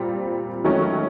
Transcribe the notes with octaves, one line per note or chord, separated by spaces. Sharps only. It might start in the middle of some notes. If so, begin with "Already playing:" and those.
Already playing: A#2 G3 C4
D#3 F#3 A3 C#4